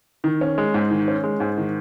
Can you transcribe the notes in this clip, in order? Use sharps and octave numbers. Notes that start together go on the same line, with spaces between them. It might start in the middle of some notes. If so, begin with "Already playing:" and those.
D#3
C#4
G#3
G#2
D#3
C#4
G#3
G#2
D#3